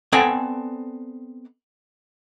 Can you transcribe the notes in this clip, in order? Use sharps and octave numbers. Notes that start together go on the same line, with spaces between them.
B3 C4 A4 D5 G5 G#5